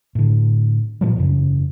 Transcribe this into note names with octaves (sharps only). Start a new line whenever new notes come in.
A2 D3
A#2 F3 G3
E1 F#2 C#3